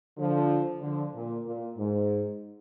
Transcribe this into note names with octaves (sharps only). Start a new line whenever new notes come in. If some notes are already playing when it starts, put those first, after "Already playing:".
D3 F3
D3 F3
A#2
A#2
G#2